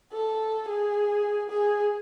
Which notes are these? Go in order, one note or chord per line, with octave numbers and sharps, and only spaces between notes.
A4
G#4
G#4